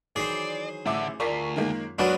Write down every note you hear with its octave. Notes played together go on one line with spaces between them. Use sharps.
D#3 E3 F#3 G#4 C5 D5
A1 D3 E5 D6
D2 F4 A#4 D5 C#6 B6 C7
F#2 D#3 G#3 A#3
F#3 G#3 A#3 D4 F#4 B4 C#6